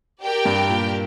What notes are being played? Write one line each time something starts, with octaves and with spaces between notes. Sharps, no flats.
G4 A#4 D5 G5
G2
A#2